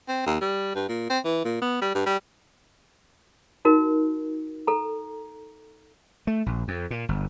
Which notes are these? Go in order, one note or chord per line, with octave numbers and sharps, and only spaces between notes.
C4
D#2
G3
G2
A#2
C4
E3
A#2
B3
G3
G2
G3
D#4 F#4 A#4
A4 A#5
A3
A#1
F2
A#2
G1